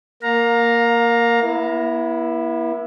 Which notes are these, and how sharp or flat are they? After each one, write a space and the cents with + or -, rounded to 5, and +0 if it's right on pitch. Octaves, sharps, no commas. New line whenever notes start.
A#3 +0 F5 +25 A#5 +0
B3 -45 E4 +0